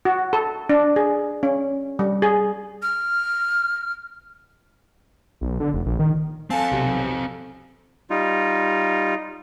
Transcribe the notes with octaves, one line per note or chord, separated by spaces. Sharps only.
F#4
A4
D4
G#4
C#4
G3
G#4
F6
B1
D3
F1
A#1
D#3
C4 A4 F5 G#5 A5
B1 C3
G3 D#4 F4